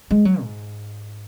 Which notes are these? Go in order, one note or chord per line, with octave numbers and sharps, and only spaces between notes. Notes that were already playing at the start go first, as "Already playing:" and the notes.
G#3
F#3
G#2